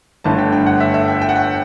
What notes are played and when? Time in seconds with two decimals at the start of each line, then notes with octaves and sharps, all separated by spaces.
0.24 G1 G2 D3 A3 A5
0.38 G5
0.52 G5
0.66 F#5
0.80 E5
0.94 E5
1.08 G5
1.22 G5
1.29 F#5
1.36 G5